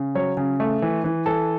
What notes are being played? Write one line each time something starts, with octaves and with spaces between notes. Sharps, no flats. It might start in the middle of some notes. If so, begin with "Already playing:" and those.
Already playing: C#3
F#3 C#5
C#3
A3
E3
E3
E3 A4